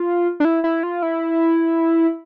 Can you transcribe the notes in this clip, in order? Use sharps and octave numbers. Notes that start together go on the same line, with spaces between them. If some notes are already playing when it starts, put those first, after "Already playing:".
Already playing: F4
D4
E4
E4
F4
E4